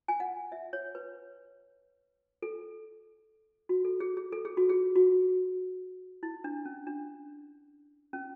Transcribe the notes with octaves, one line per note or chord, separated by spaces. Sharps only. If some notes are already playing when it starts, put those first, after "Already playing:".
G#5
F#5
E5
C#5
B4
A4
F#4
A4
G#4
G#4
A4
G#4
F#4
G#4
F#4
E4
D4
C#4
D4
C#4